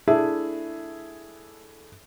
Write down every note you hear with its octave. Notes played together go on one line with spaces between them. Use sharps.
A3 D4 E4 G#4 E5